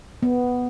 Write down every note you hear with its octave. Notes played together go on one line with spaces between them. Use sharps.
B3